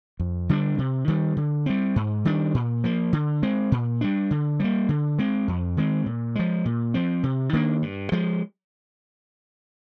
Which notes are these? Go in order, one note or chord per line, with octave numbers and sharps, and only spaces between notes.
F2
D3 G3 D4
C3
D#3 G3
D3
G3 C4
G#2
D#3 G3 D4
A#2
F3 A#3
D3
G#3 C4
A#2
G3 D4
D3
G3 A#3
D3
G#3 C4
F2
D#3 G#3 C4
A#2
F3 G#3
A#2
F3 C4
C3
D#3 A#3 D4
G2
F3 G#3